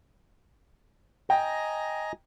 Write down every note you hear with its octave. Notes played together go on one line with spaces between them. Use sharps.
D#5 G5 G#5 A#5